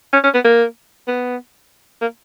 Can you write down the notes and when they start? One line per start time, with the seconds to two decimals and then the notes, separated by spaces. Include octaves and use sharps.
0.13 C#4
0.24 C#4
0.34 B3
0.44 A#3
1.08 B3
2.01 A#3